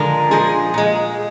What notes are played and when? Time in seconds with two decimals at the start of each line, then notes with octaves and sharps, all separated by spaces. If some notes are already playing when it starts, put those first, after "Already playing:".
Already playing: D3 F3 G#3 A#4
0.31 A#2 F3 G#3 G#4
0.74 A#2 G#3